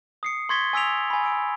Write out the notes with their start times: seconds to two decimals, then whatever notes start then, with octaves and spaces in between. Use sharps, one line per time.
0.23 D#6 C7 C#7
0.49 C6 C#6 G#6 A6 B6 G7
0.73 G#5 D#6 E6 B6 D7 F7
1.10 G#5 B5
1.24 E6 D7